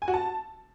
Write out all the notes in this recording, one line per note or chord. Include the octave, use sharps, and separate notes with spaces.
G#5
F#4
A5